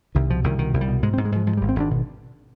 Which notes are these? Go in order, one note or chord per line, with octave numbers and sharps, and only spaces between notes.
C2 D#3
B2 F3
C2 D#3
B2 D#3
C2
G3
B2
G#2 G#3
C4
G#2
G#3
G#2 F3
G#2 F3
G3
G#1
C4
G#1 D4
B2